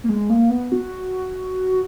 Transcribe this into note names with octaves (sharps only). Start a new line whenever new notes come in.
A#3
G#3
A#3
B3
F#4